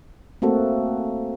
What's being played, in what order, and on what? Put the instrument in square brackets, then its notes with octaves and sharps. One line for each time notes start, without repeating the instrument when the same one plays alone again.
[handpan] A3 A#3 C4 F#4 A4